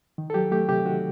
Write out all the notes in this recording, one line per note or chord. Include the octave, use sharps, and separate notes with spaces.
D#3
A4
F#3 G4
A3 G4
C3 G4
D#3 F#4